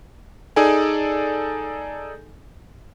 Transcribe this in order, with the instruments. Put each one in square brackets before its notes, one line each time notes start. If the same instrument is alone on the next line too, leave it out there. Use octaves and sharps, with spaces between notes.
[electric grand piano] D#4 G#4 A4 D5 G#5